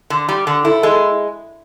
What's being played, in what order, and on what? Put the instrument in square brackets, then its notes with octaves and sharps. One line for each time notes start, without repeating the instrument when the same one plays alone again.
[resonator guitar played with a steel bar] D3
G3
D3
[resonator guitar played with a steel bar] E4 [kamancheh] A4
[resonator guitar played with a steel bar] G#3